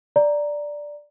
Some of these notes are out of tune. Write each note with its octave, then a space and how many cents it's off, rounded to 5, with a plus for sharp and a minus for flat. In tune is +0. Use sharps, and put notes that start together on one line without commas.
D5 +0 A#5 +0